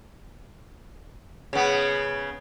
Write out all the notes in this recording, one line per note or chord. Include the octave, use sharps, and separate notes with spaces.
C#3 B3